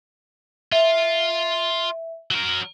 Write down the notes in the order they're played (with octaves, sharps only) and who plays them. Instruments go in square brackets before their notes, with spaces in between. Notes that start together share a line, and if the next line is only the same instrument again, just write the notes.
[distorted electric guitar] F4 [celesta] E5
[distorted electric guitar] F#3 A#4